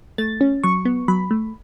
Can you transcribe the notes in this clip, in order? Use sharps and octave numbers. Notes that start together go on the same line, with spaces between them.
A3 A6
C#4
F#3 C#6
B3
F#3 B5
A3